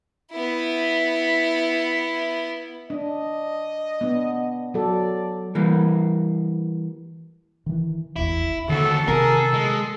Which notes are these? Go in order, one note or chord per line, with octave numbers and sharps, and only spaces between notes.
B3 E4
D4 D#5
B3 D4
F#3 A4 D5
E3 G3 A#3
D#3 E3
D#1 G#1 E2 E4
D#2 D3 F#4 A4
C3 D#3 C4 G#4 A#4
G#3